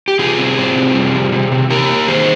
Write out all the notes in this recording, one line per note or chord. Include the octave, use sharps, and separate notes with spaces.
G4
C3 F4 G#4
C4
C4
C3
G3
C3
C3
C3
A#3 G4 A#4
A#3
D#3 G#4 C5